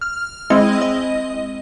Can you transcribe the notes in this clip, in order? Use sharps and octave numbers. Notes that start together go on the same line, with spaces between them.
F6
G#3 C4 E4 D#5
D#5